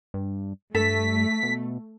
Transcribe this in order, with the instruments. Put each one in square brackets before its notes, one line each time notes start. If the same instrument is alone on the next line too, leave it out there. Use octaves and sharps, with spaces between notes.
[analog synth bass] G2
[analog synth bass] G2 [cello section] A3 [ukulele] A4 [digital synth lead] B6
[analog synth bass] B2